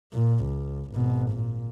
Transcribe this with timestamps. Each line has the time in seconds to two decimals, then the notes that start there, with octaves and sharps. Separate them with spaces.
0.14 A#2
0.45 C#2
0.92 G#1 B2
1.31 A#2